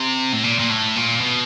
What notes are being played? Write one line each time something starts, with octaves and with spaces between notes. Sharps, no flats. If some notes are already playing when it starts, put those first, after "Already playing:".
Already playing: C3
A2
A#2
A#2
A2
A#2
B2